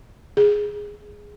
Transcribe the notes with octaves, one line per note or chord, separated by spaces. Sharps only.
G#4